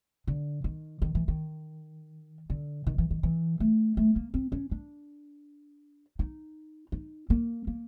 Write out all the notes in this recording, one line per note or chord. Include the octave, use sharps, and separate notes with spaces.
D3
D#3
D#3
E3
D#3
D3
D#3
E3
D#3
E3
A3
A3
A#3
C4
C#4
D4
D#4
D#4
A#3
A#3